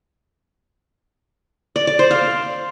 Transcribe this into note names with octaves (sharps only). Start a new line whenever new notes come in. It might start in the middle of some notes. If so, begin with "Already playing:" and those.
D5
D5
C5
F5